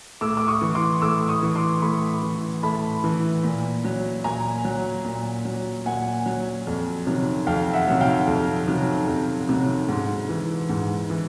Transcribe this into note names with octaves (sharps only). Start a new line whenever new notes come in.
A2 D6 E6
D6
C#6 D#6
E3
C6 D6
A2 D6 E6
C#6 D#6
E3
C6 D6
A2 B5 C#6
E3
A2 A5 B5
E3
A#2
F#3
A#2 G#5 A#5
F#3
A#2
F#3
A#2 F#5 G#5
F#3
F2
C3 D#3 F#3
F2 F5 G5
E5 F#5
C3 D#3 F#3
F5 G5
F2
C3 D#3 F#3
F2
C3 D#3 F#3
G#2
E3
G#2
E3